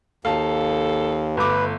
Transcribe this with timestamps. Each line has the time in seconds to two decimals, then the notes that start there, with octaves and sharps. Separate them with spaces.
0.25 D#2 A4 F5 A5
1.37 G1 A3 B4 D6